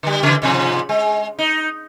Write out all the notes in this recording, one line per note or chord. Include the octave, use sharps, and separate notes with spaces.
D3 G3
C#3 E3
G#2 C3 F3
G#3
D#4